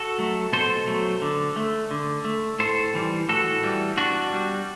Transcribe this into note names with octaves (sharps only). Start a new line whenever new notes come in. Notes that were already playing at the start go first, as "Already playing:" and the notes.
Already playing: F#4 A4
F#3 A3
B2 A4 C5
F#3 A3
D3
A3
D3
A3
A2 A4 C5
E3 G3
A2 F#4 A4
E3 G3
B2 D4 F#4
G3